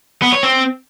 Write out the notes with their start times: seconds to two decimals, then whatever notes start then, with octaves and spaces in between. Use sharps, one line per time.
0.22 B3
0.32 C#5
0.43 C4